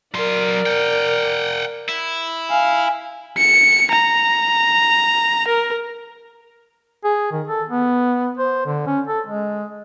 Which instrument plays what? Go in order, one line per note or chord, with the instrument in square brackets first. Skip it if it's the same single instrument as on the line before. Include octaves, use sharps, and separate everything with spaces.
[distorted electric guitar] F#3 C6 [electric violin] A#4 D5
[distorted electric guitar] F#5 G5
E4
[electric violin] F5 [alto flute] G#5
[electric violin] C#7
A#5
A#4
[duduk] G#4
D#3
A4
B3
C5
D3
C#4
A4
G#3